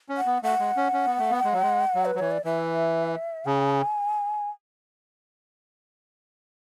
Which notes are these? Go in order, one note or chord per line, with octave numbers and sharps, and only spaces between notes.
C#4
F#5
B3
A3 F#5
G#3
C#4
C#4
B3
A3
B3
G#3
F#3
G#3
F#3
B4
F#3
E3 C#5
D5
E3 E5
C#3 G#5